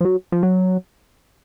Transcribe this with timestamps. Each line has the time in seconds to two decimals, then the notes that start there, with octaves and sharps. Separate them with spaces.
0.01 F3
0.05 F#3
0.32 F3
0.43 F#3